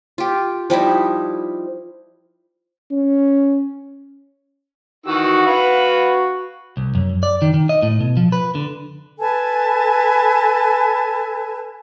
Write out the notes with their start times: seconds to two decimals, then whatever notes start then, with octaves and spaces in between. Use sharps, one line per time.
0.18 F4 G4
0.70 F3 G3 D#4 E4
2.91 C#4
5.06 D#3 E3 F#4 E6
5.47 B4 F5 B5
6.77 C2
6.95 F#2
7.23 D5
7.42 D#3
7.54 D#3
7.69 D#5
7.82 A2
8.00 B2
8.17 F3
8.32 B4
8.55 D3
9.19 A4 B4 G#5 A5